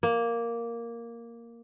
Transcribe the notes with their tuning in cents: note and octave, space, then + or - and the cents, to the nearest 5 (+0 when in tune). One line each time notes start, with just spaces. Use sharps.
A#3 +0